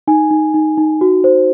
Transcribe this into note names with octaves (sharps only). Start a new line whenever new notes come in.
D#4 G#5
D#4
D#4
D#4
F#4
C5